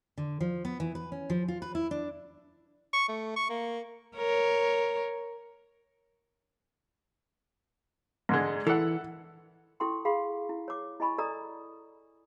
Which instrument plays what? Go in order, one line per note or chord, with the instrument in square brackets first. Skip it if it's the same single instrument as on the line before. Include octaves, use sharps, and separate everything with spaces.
[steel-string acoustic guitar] D3
F3
B3
E3
B4
C#4
F3
F4
B4
E4
D4
[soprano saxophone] C#6
A3
C#6
A#3
[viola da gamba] A#4 C#5
[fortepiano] G#2 D3 G#3
[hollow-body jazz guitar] E3 [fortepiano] A4 F#5
[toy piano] E4 A4 G5 C6 C#6
G#4 F5 F#5 B5 C6
E4
C#5 D6
E4 D#5 G#5 B5 C#6
A4 D5 D#5 G#5 A#5 D#6